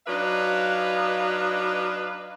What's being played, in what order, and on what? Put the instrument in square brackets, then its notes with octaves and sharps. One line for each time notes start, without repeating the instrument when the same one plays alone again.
[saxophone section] F#3 D4 D#4 B4 F5